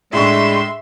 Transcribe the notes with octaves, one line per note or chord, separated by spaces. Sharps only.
A2 G#3 D4 E5 C6 C#6